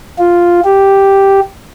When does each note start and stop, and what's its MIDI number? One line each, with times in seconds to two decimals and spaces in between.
0.18 0.60 65
0.64 1.40 67